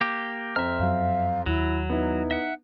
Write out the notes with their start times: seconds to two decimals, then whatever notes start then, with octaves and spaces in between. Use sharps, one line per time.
0.01 A#3 G4
0.56 F2 C4 E5 A#5 F6
0.80 F#2 F#3 F5
1.46 D#2 F#3 E4
1.90 B3 D#4 E4
2.31 E5 F#5